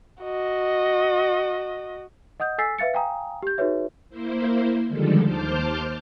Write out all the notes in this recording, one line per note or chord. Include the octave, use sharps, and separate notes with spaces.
F#4 D#5
D#5 F#5 D#6 G6
A4 G#5 E6 A6 B6 C7
B4 E5 F5 A6 C#7
F5 G5 G#5 A#5 D#6
G4 G6
D#4 F#4 G#4 B4 C#5 E5
A#3 E4 C5
D3 D#3 F3 G3 G#3 A4
D#2 C5 A5 D6 F6 G6